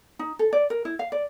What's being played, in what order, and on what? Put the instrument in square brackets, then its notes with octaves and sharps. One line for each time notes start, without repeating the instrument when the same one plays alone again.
[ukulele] D#4
A4
D5
A#4
E4
F5
D5